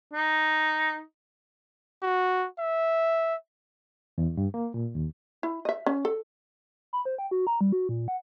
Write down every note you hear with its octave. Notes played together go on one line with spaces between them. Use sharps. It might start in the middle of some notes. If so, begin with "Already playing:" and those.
D#4
F#4
E5
E2
G2
A#3
A#2
D#2
E4
D#5 E5
C#4
A4
B5
C5
G5
F#4
A#5
G3
F#4
A#2
F#5